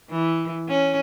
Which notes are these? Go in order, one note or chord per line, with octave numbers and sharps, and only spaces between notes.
E3
C#4